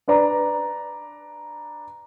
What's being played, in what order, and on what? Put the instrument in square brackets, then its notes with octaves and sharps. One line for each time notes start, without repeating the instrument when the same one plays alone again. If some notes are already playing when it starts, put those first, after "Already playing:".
[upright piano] D4 B4 D5 A#5